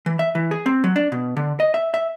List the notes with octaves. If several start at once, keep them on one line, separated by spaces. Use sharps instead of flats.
E3
E5
E3
G#4
C4
F#3
D4
B2
D3
D#5
E5
E5